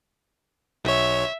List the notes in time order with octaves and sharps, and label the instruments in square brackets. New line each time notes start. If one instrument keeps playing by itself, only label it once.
[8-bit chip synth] B1 C#5 [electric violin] E5